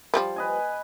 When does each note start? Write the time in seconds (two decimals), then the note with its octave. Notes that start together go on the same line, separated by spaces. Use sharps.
0.14 F3 G3 B3
0.36 B4 D#5 G#5